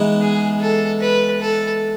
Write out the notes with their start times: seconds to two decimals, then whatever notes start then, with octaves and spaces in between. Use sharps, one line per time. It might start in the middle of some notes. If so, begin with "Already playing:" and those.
Already playing: E3 G#3 B3 D#4
0.21 G#4
0.61 A4
1.01 B4
1.41 A4